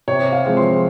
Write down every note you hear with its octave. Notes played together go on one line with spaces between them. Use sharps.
C3 C#5
F5
F3 G#3 C4
C6